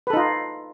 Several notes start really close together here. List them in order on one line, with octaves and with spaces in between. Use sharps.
B4 A4 D#4 F4